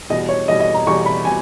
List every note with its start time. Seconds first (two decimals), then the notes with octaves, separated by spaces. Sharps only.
0.10 E2 B2 G3 D#5
0.29 C#5
0.48 E2 B2 G3 D#5
0.60 D#5
0.74 A#5
0.87 E2 B2 G3 C#6
1.06 B5
1.25 B2 G3 G#5